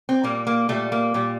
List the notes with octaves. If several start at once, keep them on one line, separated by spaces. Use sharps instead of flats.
C4
A#2 G3 A#3
A#3
A#2 G3 A3
A#3
A#2 G3